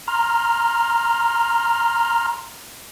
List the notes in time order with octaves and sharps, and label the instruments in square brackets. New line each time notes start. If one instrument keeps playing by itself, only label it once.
[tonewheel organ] A#5 C6 F6